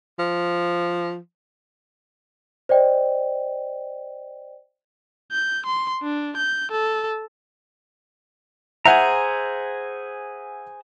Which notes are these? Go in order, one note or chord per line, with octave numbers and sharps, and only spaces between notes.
F3
C5 D5 D#5 G5
G6
C6
D4
G6
A4
G#4 C5 E5 F#5 G#5 A#5